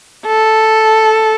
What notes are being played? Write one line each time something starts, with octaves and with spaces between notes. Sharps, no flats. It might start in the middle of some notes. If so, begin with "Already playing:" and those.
A4